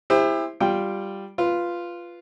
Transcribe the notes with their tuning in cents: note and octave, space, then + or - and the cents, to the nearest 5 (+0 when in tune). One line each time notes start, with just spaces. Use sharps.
E4 +0 G4 +40 C5 +0
G3 +0 F4 +0 G5 +0
F4 -5 B4 +0